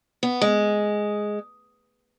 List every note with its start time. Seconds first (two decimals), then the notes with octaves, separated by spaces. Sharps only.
0.23 B3
0.42 G#3